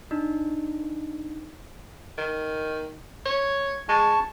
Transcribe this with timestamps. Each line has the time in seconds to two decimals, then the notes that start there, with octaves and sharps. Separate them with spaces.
0.11 D4 D#4
2.18 D#3
3.26 C#5
3.89 G#3 A5 C#6